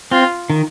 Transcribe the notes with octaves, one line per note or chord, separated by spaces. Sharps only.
C4 F4
D#3